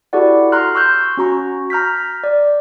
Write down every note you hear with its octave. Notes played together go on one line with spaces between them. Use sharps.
E4 F#4 G4 A4 D5 F#5
A#5 C6 F6 F#6
C6 C#6 E6 F#6 G6
C#4 F#4 A#5 C#6
A#5 F6 G6 B6
D5